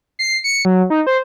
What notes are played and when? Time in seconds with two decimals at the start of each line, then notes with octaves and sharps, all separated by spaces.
0.19 C7
0.44 C#7
0.65 F#3
0.90 D#4
1.07 C5